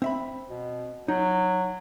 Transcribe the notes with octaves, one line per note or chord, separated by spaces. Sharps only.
C4 E5 B5
B2
F#3 D#4